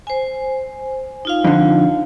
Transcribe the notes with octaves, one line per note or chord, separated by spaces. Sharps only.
C5 G#5
D#4 F4 F5
F2 D3